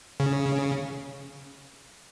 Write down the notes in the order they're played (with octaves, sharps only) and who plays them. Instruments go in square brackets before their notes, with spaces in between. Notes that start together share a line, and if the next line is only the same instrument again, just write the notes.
[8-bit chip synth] C#3